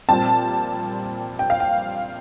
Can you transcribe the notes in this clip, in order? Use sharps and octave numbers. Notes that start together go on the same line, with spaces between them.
A#2 G3 C4 A5
G5
F5
G5